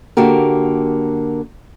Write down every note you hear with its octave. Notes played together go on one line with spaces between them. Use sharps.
D3 A#3 F#4 G4 A#4